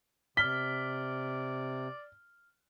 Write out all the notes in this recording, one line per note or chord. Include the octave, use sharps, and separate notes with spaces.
C3 D5 F6 B6 G7